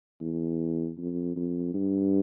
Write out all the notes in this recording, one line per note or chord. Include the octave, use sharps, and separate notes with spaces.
E2
F2
F2
G2